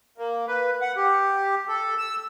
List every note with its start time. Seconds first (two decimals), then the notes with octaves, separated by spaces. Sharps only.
0.18 A#3
0.47 B4
0.81 F#5
0.97 G4
1.68 A4
1.98 E6